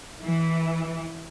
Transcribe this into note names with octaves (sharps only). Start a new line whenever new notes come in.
E3